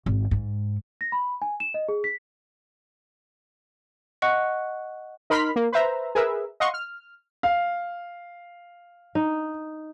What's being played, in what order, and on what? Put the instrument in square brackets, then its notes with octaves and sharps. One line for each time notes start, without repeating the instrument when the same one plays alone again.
[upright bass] G#1
G#2
[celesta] A#6
B5
G#5
E7
D#5
G#4
B6
[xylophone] D#5 F#5 C#6 F#6 C#7
[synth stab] D#4 A#4 B5 C6 F6 B6
A#3
B4 C5 E5 A#5
G#4 A#4 B4 E5
D#5 F5 F#5 C6 C#6
F6
[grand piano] F5
[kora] D#4